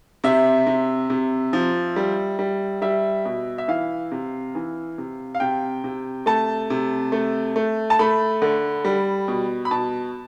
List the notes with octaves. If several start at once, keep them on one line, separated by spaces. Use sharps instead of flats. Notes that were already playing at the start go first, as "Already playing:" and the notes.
C3 E5
C3
C3
F3
G3
G3
G3 E5
B2
E5
E3 F5
C3
E3
C3
F5
C3 G5
C3
A3 A5
C3
A3
A3
A5
A3 B5
D3
G3
B2
B5
B2 A5